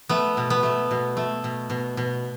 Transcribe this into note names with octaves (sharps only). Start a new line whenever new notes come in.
A3 B3
B2
B3
A3
B2
A3
B2
B2
B2